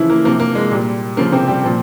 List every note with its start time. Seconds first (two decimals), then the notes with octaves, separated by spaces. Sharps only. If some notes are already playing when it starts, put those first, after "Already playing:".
Already playing: C#3 E3 F3 E4
0.10 A#3
0.24 C3 F3 A#3
0.40 A#3
0.55 G#3
0.72 A#2 G3
1.17 C#3 F3 A#3
1.32 C3 C4
1.48 G3 G4
1.64 A#2 F3